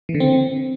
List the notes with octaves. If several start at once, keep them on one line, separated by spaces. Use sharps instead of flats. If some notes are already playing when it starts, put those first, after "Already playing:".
E3
D3
C4